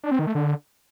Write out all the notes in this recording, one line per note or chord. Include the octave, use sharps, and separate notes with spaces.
D4
C4
D#3
A3
D3